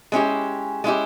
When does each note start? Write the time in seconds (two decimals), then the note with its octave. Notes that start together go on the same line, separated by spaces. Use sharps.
0.12 G#3 C#4 E4 G4
0.84 G#3 C#4 E4 G4